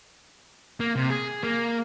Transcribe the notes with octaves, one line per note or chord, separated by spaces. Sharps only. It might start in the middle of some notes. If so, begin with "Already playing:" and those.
A#3
C3
G#4
A#3